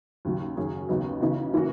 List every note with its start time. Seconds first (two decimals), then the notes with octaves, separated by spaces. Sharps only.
0.25 D#2 C#3 F#3
0.57 F#2 D#3 F#3 C#4 G#4
0.89 D#2 C#3 F#3 B3 D#4
1.21 C#3 E3 B3 D#4 F#4
1.54 E3 A#3 C#4 F#4